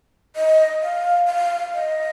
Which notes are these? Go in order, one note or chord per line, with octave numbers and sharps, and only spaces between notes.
D#5
F5
F5
D#5